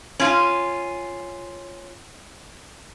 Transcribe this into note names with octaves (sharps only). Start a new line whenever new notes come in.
C#4 F4